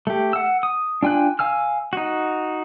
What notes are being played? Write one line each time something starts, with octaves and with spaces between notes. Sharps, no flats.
A3 G4
F#5 E6
D#6
D4 F4 G5 G#5 F#6
F5 G#5 E6 F6
D#4 F#4